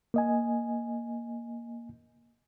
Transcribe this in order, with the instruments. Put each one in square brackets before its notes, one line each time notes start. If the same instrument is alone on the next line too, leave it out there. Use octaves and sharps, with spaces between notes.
[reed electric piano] A#3 D#5 G#5